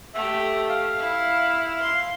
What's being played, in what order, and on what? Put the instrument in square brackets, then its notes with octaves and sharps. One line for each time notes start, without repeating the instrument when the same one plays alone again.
[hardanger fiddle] A3 G4 [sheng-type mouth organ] E5
[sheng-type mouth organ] F5
[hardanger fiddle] E4
C6